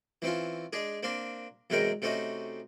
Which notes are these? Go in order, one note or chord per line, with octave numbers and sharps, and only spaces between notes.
E3 C4 C#4 F4
G#3 D4 G#4
A#3 C4 D4 F5
E2 C3 F#3 G#3 A#4 G5
C3 A3 C4 C#4 D#4 F#4